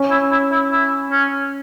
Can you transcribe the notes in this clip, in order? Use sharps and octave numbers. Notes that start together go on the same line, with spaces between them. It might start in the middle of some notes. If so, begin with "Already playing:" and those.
Already playing: C#4
E4
E4
E4
E4
C#4